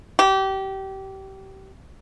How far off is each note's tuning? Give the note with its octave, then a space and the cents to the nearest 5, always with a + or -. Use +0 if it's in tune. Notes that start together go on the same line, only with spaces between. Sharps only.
G4 -25